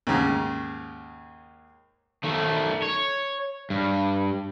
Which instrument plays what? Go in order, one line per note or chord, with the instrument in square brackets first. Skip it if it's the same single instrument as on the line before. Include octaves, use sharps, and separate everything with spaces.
[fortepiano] D#2 G#2 C#3
[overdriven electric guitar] D#3 A3
C#5
G2